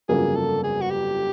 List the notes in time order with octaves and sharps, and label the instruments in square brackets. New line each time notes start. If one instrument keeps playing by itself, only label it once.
[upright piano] G1 F2 C#3 F#3 A#3 [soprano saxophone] G#4
[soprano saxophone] A4
G#4
F#4
G4